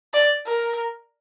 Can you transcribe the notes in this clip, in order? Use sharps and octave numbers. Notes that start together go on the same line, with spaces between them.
D5
A#4